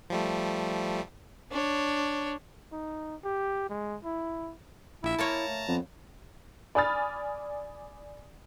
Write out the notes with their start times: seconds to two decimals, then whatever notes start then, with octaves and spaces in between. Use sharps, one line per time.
0.10 F3 G3 A3
1.51 D4 C#5
2.72 D#4
3.24 G4
3.70 G#3
4.04 E4
5.03 A#1 E4 E5
5.19 A#3 F4 C#5 A5 A#5
5.47 A3
5.68 F2 B3
6.75 D5 G#5 B5 D#6 F6 A6